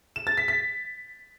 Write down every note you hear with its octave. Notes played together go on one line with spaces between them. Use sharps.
E7
A6
B6
B6